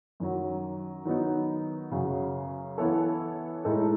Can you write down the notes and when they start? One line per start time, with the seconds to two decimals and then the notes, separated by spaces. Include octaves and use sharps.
0.20 F#2 D#3 F#3
1.05 D#3 F#3 B3 D#4
1.91 F#2 C#3 F#3
2.78 E3 B3 E4 A4 C#5
3.64 A2 G#3 D#4 A4